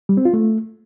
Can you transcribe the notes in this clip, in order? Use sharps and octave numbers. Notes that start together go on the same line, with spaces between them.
G3
C4
F4
A3